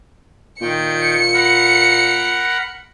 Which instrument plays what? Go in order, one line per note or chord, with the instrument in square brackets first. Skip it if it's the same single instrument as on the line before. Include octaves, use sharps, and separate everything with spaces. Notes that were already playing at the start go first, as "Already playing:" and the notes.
[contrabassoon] A#2 [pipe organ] D#3 G5 [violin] C#7
[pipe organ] A#4 F#5 B5